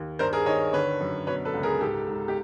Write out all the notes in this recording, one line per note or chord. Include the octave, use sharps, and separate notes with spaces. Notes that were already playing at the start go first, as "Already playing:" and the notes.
Already playing: D#2
G2 A#4 C5
G#4 A#4
D#3 C#5 D#5
D3 B4 C#5
F#2
B2 B4 C#5
A4 B4
C#2
G#4 A#4
G#2 G4 A4
G#2
G4